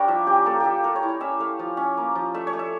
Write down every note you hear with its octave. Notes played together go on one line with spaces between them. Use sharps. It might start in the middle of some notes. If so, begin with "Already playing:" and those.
Already playing: G3 D4 G4 A#4 C#5
F3 E5
C#4 G4
A#3 A4
F4 G4 A4
A3 A#4
C#5
E4
C#5
C#4 E5
A3 F5
F3
C#4
A#3
F3
A3 E5
C#5
A3
E5